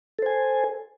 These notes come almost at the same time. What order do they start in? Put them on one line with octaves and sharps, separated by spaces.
A4 C5 G#5